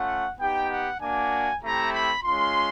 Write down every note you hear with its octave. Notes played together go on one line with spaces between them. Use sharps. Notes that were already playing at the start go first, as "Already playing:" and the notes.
Already playing: A3 C#4 F4 F#5
B3 D#4 G4 G5
F#5
A#3 D4 F#4 G#5
A3 C4 E4 G4 A#5
B5
G#3 C#4 F4 C6